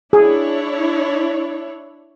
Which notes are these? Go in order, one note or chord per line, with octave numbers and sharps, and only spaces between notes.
D4 E4 G#4 C#5